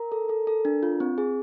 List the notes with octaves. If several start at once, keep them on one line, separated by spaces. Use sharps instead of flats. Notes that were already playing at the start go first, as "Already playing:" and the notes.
Already playing: A#4 A#5
A4
A4
A4
D4
F4
C4
G#4